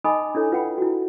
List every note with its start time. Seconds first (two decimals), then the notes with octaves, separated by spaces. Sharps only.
0.04 D#4 D#5 G#5 B5 D6 D#6
0.35 D4 E4 A4 C#5
0.52 F4 B4 F#5 G5 B5
0.78 E4 F#4